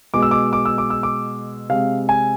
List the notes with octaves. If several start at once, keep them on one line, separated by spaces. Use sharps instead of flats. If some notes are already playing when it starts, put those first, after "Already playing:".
B2 G#3 D6
E6
D6
D6
E6
D6
E6
D6
C3 G#3 F5
G#5